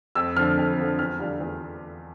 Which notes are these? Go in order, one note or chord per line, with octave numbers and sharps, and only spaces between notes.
F2 E6
D3 F3 F6
F2
D3 F3
E2 F6
D3 G3 D4 F4
E2